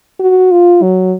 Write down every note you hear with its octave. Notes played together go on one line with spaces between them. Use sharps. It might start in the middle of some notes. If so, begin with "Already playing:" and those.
F#4
F4
F#3